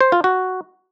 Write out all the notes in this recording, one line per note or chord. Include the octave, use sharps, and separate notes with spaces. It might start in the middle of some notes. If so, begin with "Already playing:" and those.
C5
F4
F#4